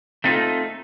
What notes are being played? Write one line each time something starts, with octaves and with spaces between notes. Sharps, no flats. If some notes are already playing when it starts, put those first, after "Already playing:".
A3 C4 D#4 F4 F#4 A4